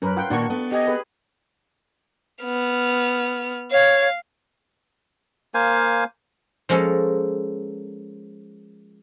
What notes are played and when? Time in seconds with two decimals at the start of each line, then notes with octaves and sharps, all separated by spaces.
0.02 F#2 C#4 A#4 B4
0.17 F4 F#5 G5
0.30 A#2 D#3 A#3 D4 F#4 C#6
0.50 B3 A4
0.72 G4 D#5 G#5
0.87 G#4 B4
2.44 B3 F6
3.72 C#5 F5
5.54 A#3 C5 F5 G#5
6.69 F3 G#3 A#3 C#4 A4